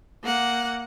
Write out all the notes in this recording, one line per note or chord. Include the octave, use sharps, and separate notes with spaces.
A#3 F#5